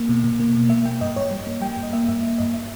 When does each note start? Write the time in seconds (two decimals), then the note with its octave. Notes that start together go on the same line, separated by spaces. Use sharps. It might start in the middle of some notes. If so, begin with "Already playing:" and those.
Already playing: A#3
0.09 B2
0.24 B2
0.40 A#3
0.55 B2
0.69 A#3 E5
0.85 A#3 G5
1.01 G2 D#5
1.16 G2 C#5
1.31 G3
1.47 A#3
1.62 G3 G5
1.77 G2
1.83 D#5
1.93 A#3 E5
2.08 G2 E5
2.23 A#3
2.38 G2 D#5
2.54 E5